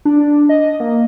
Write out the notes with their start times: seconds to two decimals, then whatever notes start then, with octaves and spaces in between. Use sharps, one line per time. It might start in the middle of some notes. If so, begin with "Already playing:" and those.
0.05 D4
0.49 D#5
0.80 A#3